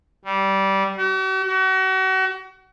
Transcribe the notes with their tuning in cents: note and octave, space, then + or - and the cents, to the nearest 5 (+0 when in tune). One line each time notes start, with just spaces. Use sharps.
G3 -15
F#4 +45
F#4 +35